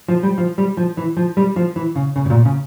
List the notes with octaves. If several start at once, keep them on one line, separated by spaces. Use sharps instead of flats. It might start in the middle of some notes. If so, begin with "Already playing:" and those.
F3
G3
F3
G3
F3
E3
F3
G3
F3
E3
C#3
C#3
A2
A#2
C#3